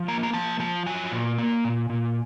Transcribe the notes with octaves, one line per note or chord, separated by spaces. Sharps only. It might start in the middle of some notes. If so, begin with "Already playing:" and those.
Already playing: F3
A#3 A#5
A#5
F3 A5
F3 A5
F#3 G#5
A#2
A#3
A#2
A#2